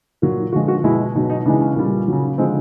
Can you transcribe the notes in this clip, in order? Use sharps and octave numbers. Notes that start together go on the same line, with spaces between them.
A#2 F#3
D3 F3 G#3 F#4
F#4
B2 G#3 E4
B2 F#3 D#4
D#4
C#3 E3 G#3 D4
C#4
A#2 G3
C#3 F#3
D3 F3 G#3 C4